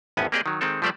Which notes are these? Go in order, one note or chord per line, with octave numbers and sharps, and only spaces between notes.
G#1 E2 A2 B3 C#4 G#5
A#3 C4 G4 G#4 D5 D#5
D#3 F#3
D#3 G#3 C4 A4
F3 G3 A3 G4 C5 D5